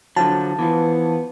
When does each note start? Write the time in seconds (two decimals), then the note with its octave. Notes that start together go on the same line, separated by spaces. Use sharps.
0.17 D3 F3 F#3 A5
0.59 E3 F3 B3